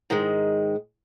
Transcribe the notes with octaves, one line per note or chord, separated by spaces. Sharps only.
G#2 D#3 G#3